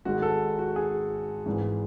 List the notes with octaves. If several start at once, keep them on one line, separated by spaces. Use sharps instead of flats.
G#1 G#2 D#3 G#3 F#4
A4
F#4
G#4
G#1 G#2 E3